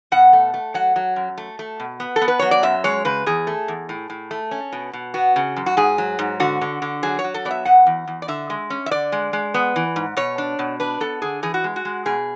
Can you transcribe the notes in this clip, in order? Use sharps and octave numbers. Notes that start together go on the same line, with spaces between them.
B2 F#5
A3
A3
F#3 F#5
F#3
F#2
A3
A3
B2
B3
A4
B3
B4
F#3 C#5
D5
F#2 E5
G#3 C#5
C#3 B4
E2 G#4
A3
E2
A2
A2
A3
C#4
B2
B2
B3 F#4
C#3
F#2
F#4
G#2 G#4
F#3
G#2
D3 F#4
D3
D3
F#3 G#4
C#5
F#3
A4
B3 D5
E5
B2 F#5
E2
E2
D5
D3 E5
G#3
C#4
E5
D3 D5
G#3
G#3
B3
E3
G#2
B2 C#5
D4
B2
D4 B4
B3 A4
D3 G#4
E3 G#4
F#4
G#3
F#4
G#3
B2 G#4